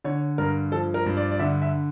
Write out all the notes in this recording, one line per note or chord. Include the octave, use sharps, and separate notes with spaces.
D3 C#5
G2 A#4
F3 A4
A#4
G2
D5
D5
D3 E5
E5